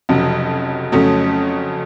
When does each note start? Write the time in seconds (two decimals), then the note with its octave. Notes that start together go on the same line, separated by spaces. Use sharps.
0.09 F1 F2 C#3 F#3
0.92 F2 C#3 F#3 A3 C#4